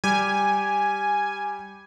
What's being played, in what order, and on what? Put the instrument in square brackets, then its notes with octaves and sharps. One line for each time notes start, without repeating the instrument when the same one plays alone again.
[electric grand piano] G3 G4 [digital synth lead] G#5